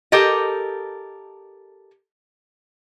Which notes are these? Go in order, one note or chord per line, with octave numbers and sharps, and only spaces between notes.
G4 A4 A#4 D#5